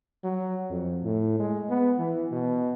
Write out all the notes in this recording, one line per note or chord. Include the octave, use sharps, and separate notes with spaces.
F#3
F2
A2
G#3
B3
E3
B2